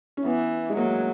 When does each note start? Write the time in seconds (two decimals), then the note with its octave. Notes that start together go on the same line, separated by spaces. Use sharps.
0.17 C#4
0.25 E3 B3
0.70 G#3
0.77 F#3 A#3